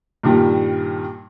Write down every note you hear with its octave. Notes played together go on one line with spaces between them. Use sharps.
G2 A#2 D#3 G3